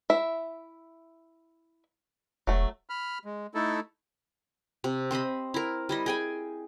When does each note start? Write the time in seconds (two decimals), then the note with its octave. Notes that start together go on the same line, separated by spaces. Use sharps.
0.10 E4 E5
2.47 E1 F#3 A3
2.90 B5 F6
3.25 G#3
3.55 A3 D#4 E4 A4
4.84 C3
5.11 C4 C5 D#5 B5
5.54 E4 A#4
5.89 G3 E4 D#5
6.06 G#4 G5 G#5